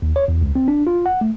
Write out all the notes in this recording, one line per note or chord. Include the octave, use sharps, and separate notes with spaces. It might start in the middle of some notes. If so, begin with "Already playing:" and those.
D#2
C#5
E2
C#2
C4
D4
F4
F#5
A3